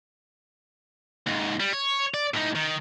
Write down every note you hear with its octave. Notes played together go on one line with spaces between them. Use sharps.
D#2 G#2
G3
C#5
D5
A2 D#4
D#3